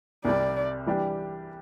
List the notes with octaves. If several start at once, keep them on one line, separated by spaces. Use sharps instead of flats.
C2 C3 G3 D5
E3 G3 D4 G4